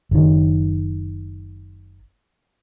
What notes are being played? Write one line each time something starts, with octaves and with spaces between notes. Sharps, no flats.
F#1 D#3